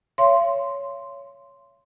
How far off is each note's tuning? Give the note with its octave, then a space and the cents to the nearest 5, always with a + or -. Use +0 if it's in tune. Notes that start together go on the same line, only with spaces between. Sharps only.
C#5 +10 F5 -45 C6 +0